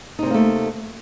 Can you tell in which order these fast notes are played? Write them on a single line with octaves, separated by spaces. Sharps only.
D#4 C3 C4 A#3 A3